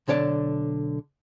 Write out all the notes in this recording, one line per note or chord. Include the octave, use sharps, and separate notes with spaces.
B1 D3 C#5 D5 A5